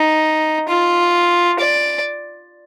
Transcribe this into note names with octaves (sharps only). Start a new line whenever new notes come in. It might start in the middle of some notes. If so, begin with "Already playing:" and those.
Already playing: D#4
F4
D5